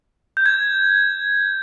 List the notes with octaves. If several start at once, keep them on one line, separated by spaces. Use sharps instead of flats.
G6
G#6